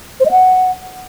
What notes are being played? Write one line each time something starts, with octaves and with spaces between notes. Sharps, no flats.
C5
D#5
F#5